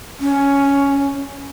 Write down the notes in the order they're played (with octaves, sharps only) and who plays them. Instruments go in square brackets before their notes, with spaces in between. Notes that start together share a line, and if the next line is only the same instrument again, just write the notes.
[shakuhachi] C#4